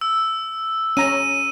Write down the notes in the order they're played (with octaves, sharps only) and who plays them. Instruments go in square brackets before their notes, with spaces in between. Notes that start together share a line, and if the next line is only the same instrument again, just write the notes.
[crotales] E6
[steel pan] C#4 A#5 [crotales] D#7